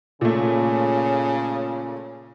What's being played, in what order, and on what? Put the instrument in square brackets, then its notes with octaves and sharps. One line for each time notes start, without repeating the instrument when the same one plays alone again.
[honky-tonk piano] A#2 A3 [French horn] C#3